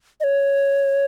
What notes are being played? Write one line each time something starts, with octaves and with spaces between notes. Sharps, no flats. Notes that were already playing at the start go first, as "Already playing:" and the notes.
D#5
C#5